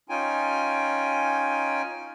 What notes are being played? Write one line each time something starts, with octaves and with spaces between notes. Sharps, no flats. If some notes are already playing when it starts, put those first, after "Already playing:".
C#4 D#4 F4 G5 G#5